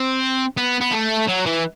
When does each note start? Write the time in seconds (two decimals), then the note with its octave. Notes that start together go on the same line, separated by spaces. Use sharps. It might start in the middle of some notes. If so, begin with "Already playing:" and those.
Already playing: C4
0.57 B3
0.81 B3
0.92 A3
1.29 F#3
1.47 E3